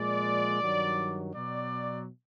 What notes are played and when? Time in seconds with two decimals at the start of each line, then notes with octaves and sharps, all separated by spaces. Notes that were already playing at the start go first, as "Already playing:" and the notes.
Already playing: A#2 F3 G#3 D5
0.61 G2 D#3 F#3
1.34 B2 F#3 D5